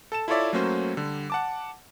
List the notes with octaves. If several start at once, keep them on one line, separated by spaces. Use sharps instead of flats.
A4 A5 E7
E4 F4 A4 C#5 D5 E5
F#3 A3 A#3 C#4 F#4 C5
D3 G3
F#5 A5 D6